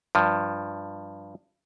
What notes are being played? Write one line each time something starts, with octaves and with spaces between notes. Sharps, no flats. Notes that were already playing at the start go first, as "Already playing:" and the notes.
G2 F3